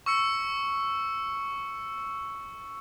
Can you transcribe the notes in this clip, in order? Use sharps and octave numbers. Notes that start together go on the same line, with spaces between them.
C#6 E6 C#7